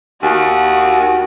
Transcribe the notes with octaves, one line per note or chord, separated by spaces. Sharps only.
D#2 F#4